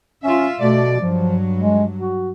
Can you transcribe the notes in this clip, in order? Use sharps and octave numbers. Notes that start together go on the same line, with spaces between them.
C#4 F4 E5
B2 A3 D5
G2 F3 F#3
G#3
F#4